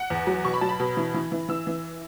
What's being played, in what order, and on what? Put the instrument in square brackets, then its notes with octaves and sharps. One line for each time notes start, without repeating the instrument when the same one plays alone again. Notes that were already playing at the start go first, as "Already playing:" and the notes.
Already playing: [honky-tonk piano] F#5
E2
F#3
B2 C#6
B5
F#3 A5
B5
B2
E3
E3
E3
E3 E6
E3